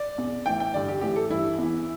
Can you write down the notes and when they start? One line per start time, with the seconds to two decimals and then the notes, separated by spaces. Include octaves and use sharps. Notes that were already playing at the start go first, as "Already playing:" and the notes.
Already playing: D5
0.18 E2 B2
0.46 A2 E3 G5
0.60 G5
0.74 G2 D3 D5
0.88 G4
1.01 A2 E3 G4
1.16 A4
1.30 G2 E3 E4
1.58 E2 E3